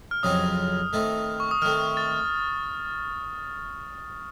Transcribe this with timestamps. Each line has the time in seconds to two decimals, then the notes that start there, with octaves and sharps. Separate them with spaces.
0.11 F6
0.23 F2 C#3 F#3 C4 D#4 D#6
0.93 D#3 A3 C4 D#4
1.40 C#6
1.51 D#6
1.62 D#3 A3 C4 F6
1.97 A6